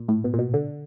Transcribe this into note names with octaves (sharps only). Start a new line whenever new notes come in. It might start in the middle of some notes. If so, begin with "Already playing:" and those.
Already playing: A#2
A2
B2
A#2
B2
D3